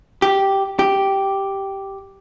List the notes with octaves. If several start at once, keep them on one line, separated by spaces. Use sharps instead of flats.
G4
G4